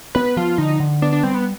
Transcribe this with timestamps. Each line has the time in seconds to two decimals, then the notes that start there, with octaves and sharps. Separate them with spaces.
0.15 B3 B4
0.37 F3 F4
0.58 D3 D#4
0.80 D3
1.02 B3 D4
1.13 D4
1.23 G3 C4
1.34 B3